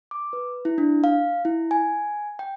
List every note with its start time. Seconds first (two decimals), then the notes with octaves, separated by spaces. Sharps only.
0.11 D6
0.33 B4
0.65 E4
0.78 D4
1.04 F5
1.45 E4
1.71 G#5
2.39 G5